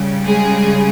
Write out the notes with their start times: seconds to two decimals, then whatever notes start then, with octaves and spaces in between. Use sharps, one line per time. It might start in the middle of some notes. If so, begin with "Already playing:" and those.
Already playing: C#3 G3
0.25 G#3 G#4